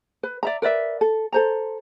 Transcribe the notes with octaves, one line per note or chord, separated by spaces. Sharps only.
B4
D5 E5 A#5
A#4 B4 D5 E5
A4
A4 C5 A#5